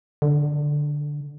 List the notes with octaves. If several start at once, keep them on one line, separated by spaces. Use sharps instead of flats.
D3